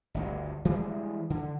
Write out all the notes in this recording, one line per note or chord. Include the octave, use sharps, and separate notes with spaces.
G1 D2 G2
E3 G3 G#3
D3